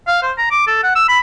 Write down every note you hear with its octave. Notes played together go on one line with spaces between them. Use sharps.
F5
C5
A#5
D6
A4
F#5
E6
B5